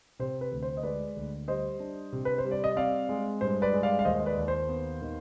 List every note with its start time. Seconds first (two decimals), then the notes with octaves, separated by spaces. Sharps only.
0.19 C3 C5
0.41 B4
0.52 D2
0.63 C5
0.77 D#5
0.83 G#3 B4 D5
1.16 D2
1.48 G3 C5 D#5
1.80 D4
2.12 C3
2.25 B4
2.38 C5
2.44 G3
2.51 D5
2.64 D#5
2.76 C4 D5 F5
3.09 G#3
3.41 G2 C5
3.62 B4 D5
3.73 G#3
3.83 D5 F5
3.99 F5
4.05 D#2 C5 D#5
4.20 D#5
4.26 B4 D5
4.37 D#2
4.48 C5
4.69 B3
5.02 D#3